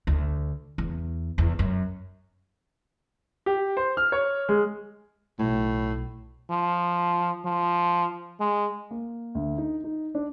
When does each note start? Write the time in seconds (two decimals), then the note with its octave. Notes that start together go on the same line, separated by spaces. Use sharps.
0.07 D2
0.78 E2
1.38 E2
1.59 F#2
3.46 G4
3.77 C5
3.97 F6
4.12 C#5
4.49 G#3
5.39 B1 A2
6.50 F3
7.46 F3
8.40 G#3
8.91 A#3
9.35 D2
9.58 D#4
9.84 D#4
10.15 D4